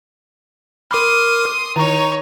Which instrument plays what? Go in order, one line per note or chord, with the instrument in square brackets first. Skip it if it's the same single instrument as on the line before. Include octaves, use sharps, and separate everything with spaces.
[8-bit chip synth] A#4 D6 F6 [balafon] B5 [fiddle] C6 D#6
[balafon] D#3 [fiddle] D#4 C#5 [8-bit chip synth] A#5 C#6